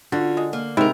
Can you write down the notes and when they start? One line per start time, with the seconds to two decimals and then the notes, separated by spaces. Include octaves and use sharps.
0.12 D3 F4 F#4
0.37 G#3
0.53 A#3
0.77 G#2 C3 E4 A#4